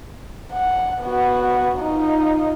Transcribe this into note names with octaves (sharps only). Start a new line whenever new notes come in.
F#5
B3 F#4
D#4 F4